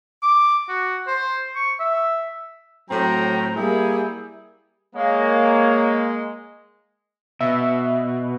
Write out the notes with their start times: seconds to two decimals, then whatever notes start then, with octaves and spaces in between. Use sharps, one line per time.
0.23 D6
0.69 F#4
1.07 C5
1.55 C#6
1.80 E5
2.90 A2 F#3 C4 G5 A#5
3.56 G3 A#3 E4 G#4
4.96 G#3 A#3 C#5
7.41 B2 E5